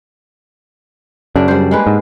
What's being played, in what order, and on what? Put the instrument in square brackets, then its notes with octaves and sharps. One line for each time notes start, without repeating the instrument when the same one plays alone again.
[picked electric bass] F#2 C#3 [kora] D4
[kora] G3 C5
G#3 A#3 B4
[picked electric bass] G#2